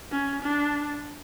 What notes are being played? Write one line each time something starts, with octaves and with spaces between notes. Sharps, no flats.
C#4
D4